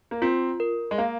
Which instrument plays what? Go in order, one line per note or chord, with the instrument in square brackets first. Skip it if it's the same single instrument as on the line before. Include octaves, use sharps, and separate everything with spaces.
[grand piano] A#3
[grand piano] C4 [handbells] F4
[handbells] A#4
[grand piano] G#3
[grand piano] A#3 [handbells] F5